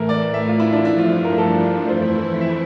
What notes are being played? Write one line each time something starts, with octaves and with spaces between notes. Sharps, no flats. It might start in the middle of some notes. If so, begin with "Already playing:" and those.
Already playing: A2 E3 A3 A#4
D5
E5
F4
E4
D4
G2 F3 A3 D4 E4
F4
E4
A#4
A4
F2 E3 A3 E4 C5
E5